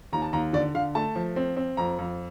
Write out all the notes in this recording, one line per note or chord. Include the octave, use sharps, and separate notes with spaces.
D#2 A#5
A5
D#2 A#5
D3 D5
D3 F5
A3 A5
F3
C4
C4
F2 A#5
F2